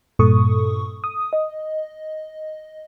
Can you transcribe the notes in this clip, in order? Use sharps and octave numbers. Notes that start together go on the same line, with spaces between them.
G2 A#2 A4 C#6 D#6
D#6
D#5